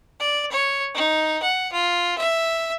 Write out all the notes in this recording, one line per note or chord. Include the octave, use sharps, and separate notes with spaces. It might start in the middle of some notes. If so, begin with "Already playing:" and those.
D5
C#5
D#4
F#5
F4
E5